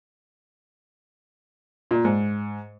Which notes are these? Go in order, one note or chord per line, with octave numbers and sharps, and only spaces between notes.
A#2
G#2